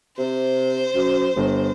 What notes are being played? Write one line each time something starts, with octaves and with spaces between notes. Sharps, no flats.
C3 C5
F#2
G1